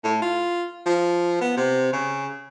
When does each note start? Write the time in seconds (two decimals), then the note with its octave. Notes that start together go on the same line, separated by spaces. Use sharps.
0.04 A2
0.22 F4
0.86 F3
1.41 B3
1.57 C3
1.93 C#3